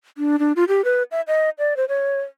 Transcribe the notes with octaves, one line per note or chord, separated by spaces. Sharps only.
D4
D4
F4
G4
B4
E5
D#5
D5
C5
C#5